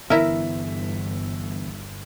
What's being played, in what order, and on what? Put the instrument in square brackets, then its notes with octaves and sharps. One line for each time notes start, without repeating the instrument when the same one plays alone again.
[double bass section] G1 [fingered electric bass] D3 E3 B3 [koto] E4 A#4 [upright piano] E5